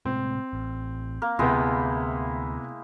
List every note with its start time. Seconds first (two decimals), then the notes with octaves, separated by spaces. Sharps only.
0.05 A2 C3 G#3 C4
0.53 A1
1.22 A#3
1.39 D2 C3 G#3 B3 E4 G5